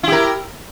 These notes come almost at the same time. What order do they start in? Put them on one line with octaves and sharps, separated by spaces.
E4 G4 A#4